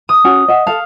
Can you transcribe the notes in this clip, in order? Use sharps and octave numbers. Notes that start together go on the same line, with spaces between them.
D#6
C#4 F#4 G#5
D#5 E5 F#5
A4 F5 A5